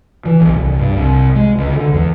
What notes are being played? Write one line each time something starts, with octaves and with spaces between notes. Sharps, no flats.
E3
B1
C2
G2
C2
G#3
C#2
D3
E2